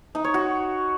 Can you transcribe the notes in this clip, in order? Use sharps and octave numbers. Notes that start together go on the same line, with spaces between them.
D#4
C#5
F#4